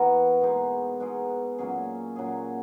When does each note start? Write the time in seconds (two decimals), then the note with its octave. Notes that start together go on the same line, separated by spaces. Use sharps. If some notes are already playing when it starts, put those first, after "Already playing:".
Already playing: E3 B3 F#4 A#4
0.41 B2 G#3 D#4 G#4
1.00 B2 G#3 D#4 G#4
1.58 A#2 F#3 C#4 G#4
2.16 A#2 F#3 C#4 G#4